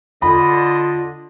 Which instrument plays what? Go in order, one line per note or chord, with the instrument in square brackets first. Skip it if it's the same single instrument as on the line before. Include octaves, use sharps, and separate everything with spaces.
[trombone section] D3 [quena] F4 [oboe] D#5 [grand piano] B5